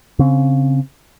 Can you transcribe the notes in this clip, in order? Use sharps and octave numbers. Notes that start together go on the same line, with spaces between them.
C#3 C4